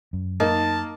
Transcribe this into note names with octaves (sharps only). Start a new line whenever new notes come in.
F#2
A#3 D#4 A5